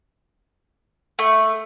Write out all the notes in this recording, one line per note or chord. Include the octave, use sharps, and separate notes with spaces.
A3